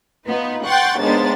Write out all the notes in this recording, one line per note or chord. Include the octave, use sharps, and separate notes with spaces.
B3 D#4 F4 B4
F#5 G5 C6 C#6 F#6 A6
D#2 G#3 B3 D4 C5 A6